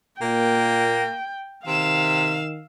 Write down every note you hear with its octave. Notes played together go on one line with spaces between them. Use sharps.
A#2 A#3 G5
C3 D#3 F5 E6 E7